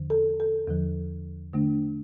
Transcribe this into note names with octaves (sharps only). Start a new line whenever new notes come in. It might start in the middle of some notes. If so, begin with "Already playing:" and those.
Already playing: E2 D3 F3
A4
A4
E2 D3 F3
D3 A3 D4